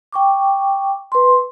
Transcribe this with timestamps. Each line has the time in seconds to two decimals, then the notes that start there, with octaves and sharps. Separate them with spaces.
0.13 G5 C#6 D6
1.12 B4 C6